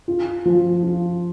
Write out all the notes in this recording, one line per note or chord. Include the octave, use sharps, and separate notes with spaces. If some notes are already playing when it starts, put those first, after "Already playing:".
F4
F3
F4